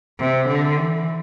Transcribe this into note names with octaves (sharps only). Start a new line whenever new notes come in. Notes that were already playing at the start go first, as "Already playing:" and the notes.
C3
D3
E3